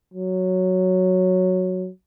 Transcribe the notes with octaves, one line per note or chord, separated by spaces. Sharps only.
F#3